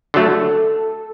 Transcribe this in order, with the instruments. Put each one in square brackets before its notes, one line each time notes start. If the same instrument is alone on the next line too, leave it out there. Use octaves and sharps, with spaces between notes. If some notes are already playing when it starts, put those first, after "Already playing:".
[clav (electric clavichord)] D3 F#3 A3 [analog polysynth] A4